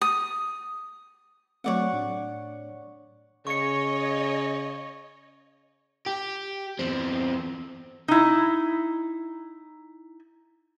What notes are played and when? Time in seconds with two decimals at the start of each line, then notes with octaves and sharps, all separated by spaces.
0.01 D#6
1.64 F#3 A3 C4 C#5 D5 F#5
1.93 A2 D4
3.47 C#3 C#5 D#5 C#6 C#7
6.06 G4
6.79 E2 C4
8.08 D#4 E4